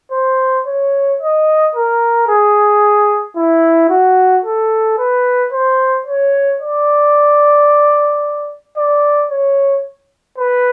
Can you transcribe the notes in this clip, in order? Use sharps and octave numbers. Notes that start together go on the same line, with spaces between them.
C5
C#5
D#5
A#4
G#4
E4
F#4
A4
B4
C5
C#5
D5
D5
C#5
B4